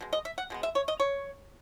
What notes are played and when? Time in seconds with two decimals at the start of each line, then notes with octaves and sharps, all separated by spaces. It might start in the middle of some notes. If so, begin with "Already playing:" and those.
0.01 B2 G#3
0.13 D#5
0.25 E5
0.38 F#5
0.50 B2 G#3 B3
0.63 E5
0.75 C#5
0.88 D#5
1.00 C#5